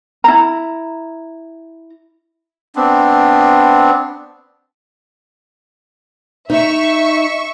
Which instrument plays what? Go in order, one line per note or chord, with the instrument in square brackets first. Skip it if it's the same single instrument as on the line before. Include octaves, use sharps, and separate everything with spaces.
[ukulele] E4 A#5
[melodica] B3 C4 D4
[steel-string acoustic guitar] D#4 [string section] E5 C#6